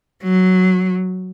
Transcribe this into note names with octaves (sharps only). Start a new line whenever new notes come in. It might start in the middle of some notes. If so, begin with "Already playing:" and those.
F#3